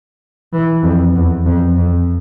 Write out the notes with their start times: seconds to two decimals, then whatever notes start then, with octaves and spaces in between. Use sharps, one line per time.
0.53 E3
0.84 F2
1.15 E2
1.46 F2
1.77 F2